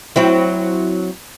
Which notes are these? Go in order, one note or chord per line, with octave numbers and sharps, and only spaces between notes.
F#3 C4 E4